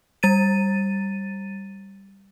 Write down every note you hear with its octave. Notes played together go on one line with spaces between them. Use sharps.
G3 A6 D#7